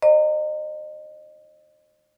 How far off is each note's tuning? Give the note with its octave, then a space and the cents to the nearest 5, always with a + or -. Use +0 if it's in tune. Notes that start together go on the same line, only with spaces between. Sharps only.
C5 +35 D#5 -30 A#5 -25